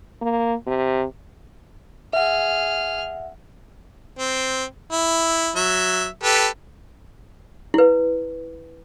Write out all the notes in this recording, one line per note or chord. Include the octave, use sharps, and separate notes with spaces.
A#3
C3
G#4 E5 F#5 F6
C4
E4
F#3 E5
G4 A4 B4
E4 B4